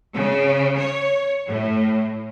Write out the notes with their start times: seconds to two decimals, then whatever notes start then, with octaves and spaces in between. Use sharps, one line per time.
0.14 C#3
0.78 C#5
1.47 A2